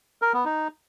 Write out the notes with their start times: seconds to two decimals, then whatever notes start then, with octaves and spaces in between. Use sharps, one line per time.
0.22 A#4
0.34 B3
0.45 D#4